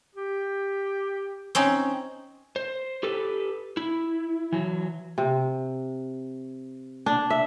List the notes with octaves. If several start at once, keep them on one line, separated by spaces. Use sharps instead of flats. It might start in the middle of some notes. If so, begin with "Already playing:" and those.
G4
C4 C#4 D#4
C5
G4 A4 B4
E4
E3 F#3
C3
D4
E5